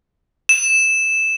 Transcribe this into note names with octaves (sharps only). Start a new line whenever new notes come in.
E7